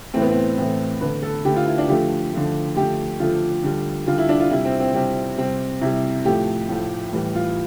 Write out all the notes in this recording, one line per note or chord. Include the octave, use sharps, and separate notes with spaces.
A2 E3 A3 C4
B3
C4
A2 E3 A3 C4
D3 A3 B4
A4
D3 A3 G4
F4
E4
D4
D3 F3 A3 G4
D3 F3 A3
D3 F3 A3 G4
D3 F3 A3 F4
D3 G3
D3 G3 F4
E4
D4
F4
C3 G3 E4
C4
C4
C3 G3 C4
C3 G3 C4
C3 G3 E4
A2 F3 A3 G4
A2 F3 A3
A2 E3 G3
F4